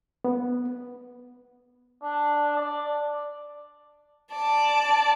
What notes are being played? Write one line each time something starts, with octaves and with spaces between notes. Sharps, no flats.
B3
D4
D5
D5 A5